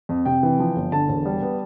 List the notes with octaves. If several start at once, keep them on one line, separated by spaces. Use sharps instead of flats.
F2
C3 G5
E3
F3
G1
D3 A5
E1
G3
B3